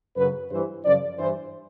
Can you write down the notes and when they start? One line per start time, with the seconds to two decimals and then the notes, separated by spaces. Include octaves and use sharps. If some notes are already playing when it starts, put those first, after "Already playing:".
0.16 F#2 C#3 F#3 B4
0.50 G2 E3 C5
0.84 F#2 C#3 F3 D5
1.18 G2 E3 C5